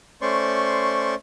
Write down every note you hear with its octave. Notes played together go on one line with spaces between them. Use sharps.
A3 C#4 C5 D5 C6 C#6